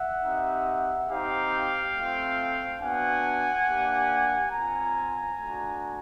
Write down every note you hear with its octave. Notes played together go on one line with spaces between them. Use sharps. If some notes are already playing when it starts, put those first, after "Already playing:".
Already playing: E5 F#5
C4 D#4 G4
C4 D#4 G4 F5 G5
A3 C4 F4
B3 D4 F#4 F#5 G#5
A#3 D4 G4
C4 F4 G#5 A#5
A3 D4 F#4